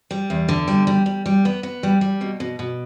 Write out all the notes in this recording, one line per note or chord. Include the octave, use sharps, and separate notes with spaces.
G3
E2
D3
G3
G3
G3
G3
B3
B3
G3
G3
B2
B2
B2